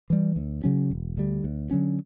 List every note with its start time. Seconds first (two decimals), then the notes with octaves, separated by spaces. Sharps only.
0.10 E3 G3
0.36 D2
0.64 C#3 F#3 C#4
0.90 E1
1.17 D2 D3 G3
1.44 D2
1.71 D3 F#3 C#4